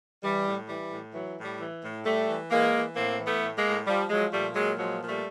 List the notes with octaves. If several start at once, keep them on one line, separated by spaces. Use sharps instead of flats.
E3 G3
A2
E3 G3
A2
E3 F#3
A2
G3
E3
A2
A2 G3 A3
E3
E3 G#3 A#3
E3
A2 A#3 C4
E3
A3 B3
A2
G#3 A#3
A2
F3 G3
F3 F#3 G#3
A#2 G3 A3
A#2 F#3 G#3
F3 F#3 G#3
A#2
G3 A3